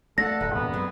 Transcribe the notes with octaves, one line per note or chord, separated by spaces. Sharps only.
A3 A4 D5 F5 F#5 A#6
D1 B4
F#2 E3 A#3 B3
E3 F#3 G#3 C4